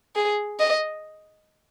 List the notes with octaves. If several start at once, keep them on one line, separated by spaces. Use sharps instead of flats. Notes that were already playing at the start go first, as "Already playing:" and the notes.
G#4
D#5